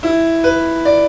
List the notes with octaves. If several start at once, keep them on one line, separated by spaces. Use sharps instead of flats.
E4
B4
D5